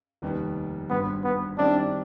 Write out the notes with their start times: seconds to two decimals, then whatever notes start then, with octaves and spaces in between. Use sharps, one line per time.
0.22 F1 D#2 D#3 G3 B3
0.90 G#1 G2 D3 B3
1.24 B3
1.58 F#2 D#3 G3 C4 D4 E4